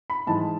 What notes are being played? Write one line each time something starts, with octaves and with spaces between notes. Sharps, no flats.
B5
G#2 E3 G#3 A5